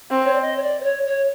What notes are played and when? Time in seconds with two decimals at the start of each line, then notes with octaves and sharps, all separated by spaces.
0.11 C4
0.24 C#5
0.33 D5
0.41 D#5
0.56 C#5
0.62 D5
0.80 C5
0.83 C#5
1.06 C#5